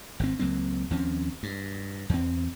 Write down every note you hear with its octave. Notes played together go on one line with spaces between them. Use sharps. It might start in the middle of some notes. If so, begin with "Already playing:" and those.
G#1 D#3 C4
C#2 F#3 A#3 C4
D#2 F3 C4 C#4
G2
E2 C4